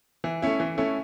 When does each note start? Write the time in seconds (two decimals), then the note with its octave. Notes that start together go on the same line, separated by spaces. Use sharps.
0.24 E3
0.42 A3 C#4 E4
0.60 E3
0.78 A3 C#4 E4